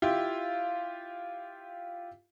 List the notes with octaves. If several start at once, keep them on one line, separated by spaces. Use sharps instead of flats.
E4 F4 G4